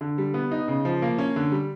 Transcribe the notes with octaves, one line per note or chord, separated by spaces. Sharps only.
D3
G3
B3
D#4
C#3
F3
A#3
C#4
D3
G3